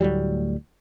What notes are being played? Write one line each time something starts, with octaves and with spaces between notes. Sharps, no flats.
D2 A2 F#3 G3